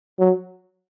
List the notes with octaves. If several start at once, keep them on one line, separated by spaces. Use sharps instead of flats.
F#3